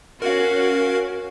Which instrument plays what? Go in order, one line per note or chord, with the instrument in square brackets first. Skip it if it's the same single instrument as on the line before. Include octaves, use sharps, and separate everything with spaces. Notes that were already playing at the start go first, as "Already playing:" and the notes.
[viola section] C#4 F#4 [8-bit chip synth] A#4 F5